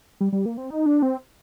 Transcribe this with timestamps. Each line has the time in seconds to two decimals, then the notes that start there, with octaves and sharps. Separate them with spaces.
0.21 G3
0.33 G3
0.46 A#3
0.57 C4
0.70 D#4
0.86 D4
1.02 C4